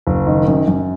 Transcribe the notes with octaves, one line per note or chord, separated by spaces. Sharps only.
F#1
D#3
F#2
F#2